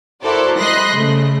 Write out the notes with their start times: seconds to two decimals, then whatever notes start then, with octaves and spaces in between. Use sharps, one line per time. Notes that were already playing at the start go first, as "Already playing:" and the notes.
0.22 E4 F#4 A4 A#4 C5 D5
0.58 G3 D#5 B5 C6 F#6 A#6
0.95 C#3 A3